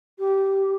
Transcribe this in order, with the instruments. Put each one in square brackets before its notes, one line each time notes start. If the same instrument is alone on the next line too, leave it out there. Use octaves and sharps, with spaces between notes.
[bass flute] G4